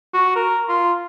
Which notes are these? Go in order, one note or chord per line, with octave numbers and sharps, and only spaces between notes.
F#4
A#4
F4